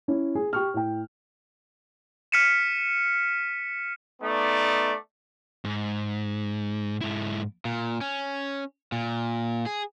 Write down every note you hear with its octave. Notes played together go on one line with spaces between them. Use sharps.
C#4 E4
G#4
G4 C#6 F6
A2 G5
F6 B6 C#7 D#7 E7
A3 B3 D#4 D5
G#2
G#2 E4
A#2
C#4
A#2
G#4